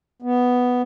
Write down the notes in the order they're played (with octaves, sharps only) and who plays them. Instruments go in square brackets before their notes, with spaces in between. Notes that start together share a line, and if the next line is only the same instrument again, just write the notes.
[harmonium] B3